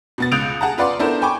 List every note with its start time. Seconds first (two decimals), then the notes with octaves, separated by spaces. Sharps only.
0.18 B2 B3 A6
0.32 C#2 D#6 F#6 G6 D7 F7
0.61 G#4 F#5 A5 A#5
0.78 F4 B4 D5 F#5 C6 D6
0.99 B3 D4 E4 A4 A#4 C5
1.22 G5 G#5 B5 C#6 D6